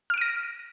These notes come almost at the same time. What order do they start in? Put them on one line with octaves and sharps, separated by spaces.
F6 D7 D#7 A#6